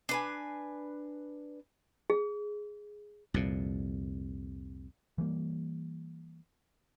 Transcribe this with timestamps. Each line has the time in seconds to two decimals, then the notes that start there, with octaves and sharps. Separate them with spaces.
0.09 D4 B4 G#5
2.10 G#4
3.34 C2 F2 A#2
5.18 E3 G3 A#3